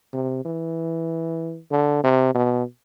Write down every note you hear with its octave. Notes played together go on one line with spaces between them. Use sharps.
C3
E3
D3
C3
B2